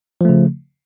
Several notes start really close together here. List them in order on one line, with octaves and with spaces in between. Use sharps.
F3 A3 C#3